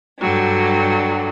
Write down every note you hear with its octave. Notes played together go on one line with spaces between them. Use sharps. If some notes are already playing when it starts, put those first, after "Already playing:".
G2 D3 F#3 G3